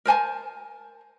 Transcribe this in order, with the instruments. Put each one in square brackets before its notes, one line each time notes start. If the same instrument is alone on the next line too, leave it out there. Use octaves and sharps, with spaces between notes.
[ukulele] A#4 C5 G#5 A5